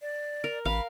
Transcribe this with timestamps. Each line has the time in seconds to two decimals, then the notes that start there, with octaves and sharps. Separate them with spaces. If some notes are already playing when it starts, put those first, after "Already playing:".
0.02 D5
0.44 A#4
0.65 A1 F5 B5